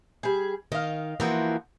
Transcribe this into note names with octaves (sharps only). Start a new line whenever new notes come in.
G3 G#4
D#3 D#5 F5
E3 F3 A#3 C4 F#4